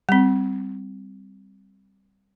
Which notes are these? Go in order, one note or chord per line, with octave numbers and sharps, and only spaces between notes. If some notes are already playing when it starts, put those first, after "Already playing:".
G3 C4